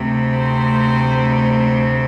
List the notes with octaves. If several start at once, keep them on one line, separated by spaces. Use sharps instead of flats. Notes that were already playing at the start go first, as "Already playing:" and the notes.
Already playing: D2 C3 A3 C4
C5